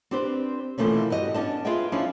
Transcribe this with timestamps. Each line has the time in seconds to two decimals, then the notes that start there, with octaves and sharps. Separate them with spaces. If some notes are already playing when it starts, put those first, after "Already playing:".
0.11 C4 D4 G4 B4 C5
0.78 B2 E3 F3 A3 A#3 C#4
1.10 G2 F#4 G4 D#5
1.34 B3 C#4 D4 D#5 A5
1.65 F4 G#4 B4 D#5 E5 G5
1.92 F3 C#4 D4 E4 F4